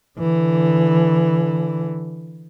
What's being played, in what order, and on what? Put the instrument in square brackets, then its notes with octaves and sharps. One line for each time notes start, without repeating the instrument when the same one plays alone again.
[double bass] D3 E3